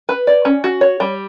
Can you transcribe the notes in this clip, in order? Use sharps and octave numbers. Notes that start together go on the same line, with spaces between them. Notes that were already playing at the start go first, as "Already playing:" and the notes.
B4
D5
C#4
F#4
C#5
G3